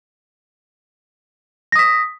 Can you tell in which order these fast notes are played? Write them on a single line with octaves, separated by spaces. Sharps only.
A#6 D#6 B6